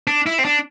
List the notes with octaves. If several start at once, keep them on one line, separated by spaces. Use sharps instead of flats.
D4
E4
C4
D4